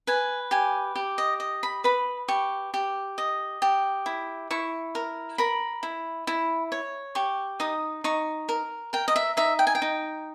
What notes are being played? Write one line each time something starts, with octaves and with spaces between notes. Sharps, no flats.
B4 G#5
G4 G#5
G4
D#5
D#5
B5
B4 B5
G4 C#6
G4
D#5
G4
E4
E4 C#6
A#4
A#4 B5
E4
E4
C#5
G4 C#6
D#4 D#6
D#4 C#6
A#4
A#4 G5
D#5
E5
D#4 E5
G5
G#5
G5
D#4